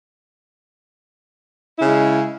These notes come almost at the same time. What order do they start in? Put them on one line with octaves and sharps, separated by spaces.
E4 C#3 G#3